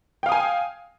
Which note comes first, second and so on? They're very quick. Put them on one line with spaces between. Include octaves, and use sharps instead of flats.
G5 F5 D#6 G#5